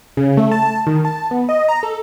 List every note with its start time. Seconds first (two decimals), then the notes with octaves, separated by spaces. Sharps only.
0.17 C#3
0.37 A3
0.51 A5
0.87 D#3
1.05 A5
1.31 B3
1.49 D#5
1.69 A#5
1.83 A4